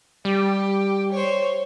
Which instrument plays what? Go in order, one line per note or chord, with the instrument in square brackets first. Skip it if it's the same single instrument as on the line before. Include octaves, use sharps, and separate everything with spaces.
[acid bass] G3 [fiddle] G4
[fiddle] C5 C#5